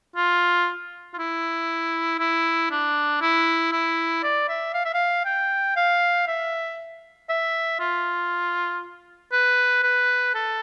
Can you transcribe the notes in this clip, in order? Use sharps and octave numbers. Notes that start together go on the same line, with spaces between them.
F4
F4
E4
E4
D4
E4
E4
D5
E5
F5
E5
F5
G5
F5
E5
E5
F4
B4
B4
A4